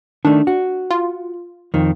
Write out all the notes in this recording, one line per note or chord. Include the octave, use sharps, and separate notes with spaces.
D#3 A3 D4
F#4
F4
F2 D#3